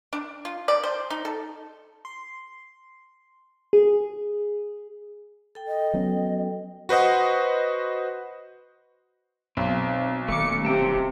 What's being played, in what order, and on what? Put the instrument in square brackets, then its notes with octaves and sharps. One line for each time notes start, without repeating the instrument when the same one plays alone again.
[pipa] D4
F4
D5
C5
D#4
A4
[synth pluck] C6
G#4
[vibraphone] A4 G5
[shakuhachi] D#5
[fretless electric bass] F#3 B3 C#4
[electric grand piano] F#4 B4 C5 D#5 F#5
[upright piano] B1 [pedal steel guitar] C4
[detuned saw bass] D#1 [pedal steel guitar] A3 D6 [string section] C#7
[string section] C3 [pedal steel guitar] C4 G5 A5